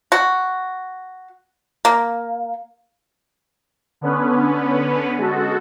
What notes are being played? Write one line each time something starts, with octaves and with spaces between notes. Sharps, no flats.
F#4
A#3
D3 B3 C#4 B4
G#3 F#4 A4